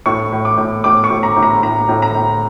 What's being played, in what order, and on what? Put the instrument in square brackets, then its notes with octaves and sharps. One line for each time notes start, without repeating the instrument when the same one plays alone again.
[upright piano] A2 C#6
A2
D6
A2
A2 D6
C#6
A2
A#5
A2
A#5
A2 A#5
A2
A#5
A2